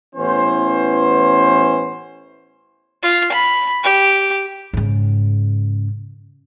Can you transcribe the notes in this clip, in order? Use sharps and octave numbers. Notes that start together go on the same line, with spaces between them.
A1 E3 B3 C#4 C5
F4
B5
G4
G#2 C#3